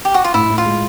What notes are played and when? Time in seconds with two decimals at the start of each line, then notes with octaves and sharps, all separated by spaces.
0.05 G4
0.14 F#4
0.24 F4
0.34 A2 E4
0.50 A2
0.58 F4
0.66 G#3